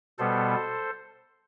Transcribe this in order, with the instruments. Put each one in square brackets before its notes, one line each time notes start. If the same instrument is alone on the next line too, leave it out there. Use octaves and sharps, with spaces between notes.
[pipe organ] B2 G3 B3 A4 C5